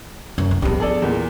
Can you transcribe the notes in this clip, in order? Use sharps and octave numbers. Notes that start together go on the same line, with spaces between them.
F#2
D3
A#1 G2 F3 B3
G#4 A4 D5
E2 A#2